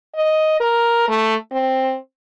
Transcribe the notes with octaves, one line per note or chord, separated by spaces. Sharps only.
D#5
A#4
A3
C4